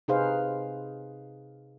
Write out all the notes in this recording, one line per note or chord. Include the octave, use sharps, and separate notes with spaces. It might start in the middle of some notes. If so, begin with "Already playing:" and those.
C3 D#4 G#4 B4 C5 F5